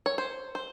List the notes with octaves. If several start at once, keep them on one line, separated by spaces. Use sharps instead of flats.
C#5
C5
C5